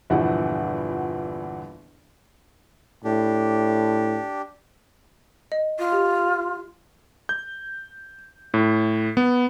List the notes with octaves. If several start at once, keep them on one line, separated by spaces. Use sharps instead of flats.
G1 E2 A#2 F3 E4 F#5
A2 D4 G4
D#5
F4
G4
G6
A2
B3